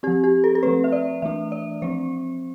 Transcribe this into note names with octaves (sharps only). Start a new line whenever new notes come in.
F3 C4 G4
G4
A4
A4
F3 A3 C4 B4
E5
D5
E3 A3 D4 E5
D5
F3 C4 C5